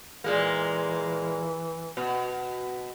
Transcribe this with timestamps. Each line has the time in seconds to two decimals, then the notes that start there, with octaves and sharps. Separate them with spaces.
0.24 A#2 E3 G#3 A#3
1.97 B2